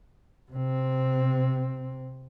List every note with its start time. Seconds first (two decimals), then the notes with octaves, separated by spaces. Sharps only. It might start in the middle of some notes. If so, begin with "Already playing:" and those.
0.52 C3 C4